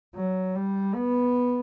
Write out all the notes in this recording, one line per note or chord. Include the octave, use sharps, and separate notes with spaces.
F#3
G3
B3